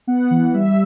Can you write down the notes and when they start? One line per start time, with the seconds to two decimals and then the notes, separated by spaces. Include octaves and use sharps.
0.07 B3 F#5
0.31 E3
0.53 G3 E5